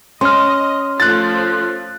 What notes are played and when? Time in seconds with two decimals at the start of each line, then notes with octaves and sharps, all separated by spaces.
0.21 C#4 D#5 C6 F6
1.00 F3 A3 F4 F#6 A6